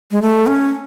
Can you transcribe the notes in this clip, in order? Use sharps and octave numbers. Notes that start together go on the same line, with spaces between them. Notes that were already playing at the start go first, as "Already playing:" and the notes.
G#3
A3
C#4